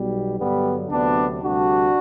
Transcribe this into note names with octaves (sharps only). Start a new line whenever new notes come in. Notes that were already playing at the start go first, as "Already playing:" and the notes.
Already playing: B1 B2 G3
G2 D3 F#3 G3 B3
D2 C3 F#3 B3 D4
D2 C3 G3 D4 F#4